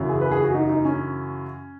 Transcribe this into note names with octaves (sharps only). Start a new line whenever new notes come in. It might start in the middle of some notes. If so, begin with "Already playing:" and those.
Already playing: F#2 C#3 E3
G#4
B4
G#4
F#4
D#4
D#4
C#4